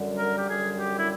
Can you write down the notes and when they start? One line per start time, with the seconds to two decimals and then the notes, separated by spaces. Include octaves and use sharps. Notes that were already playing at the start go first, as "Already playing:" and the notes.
Already playing: F#2 D3 G3
0.18 A#4
0.38 G4
0.48 F#2 D3 G3 G#4
0.77 G4
0.99 E4